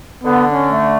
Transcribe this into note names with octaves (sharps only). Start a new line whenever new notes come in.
D3 B3
C#4
A3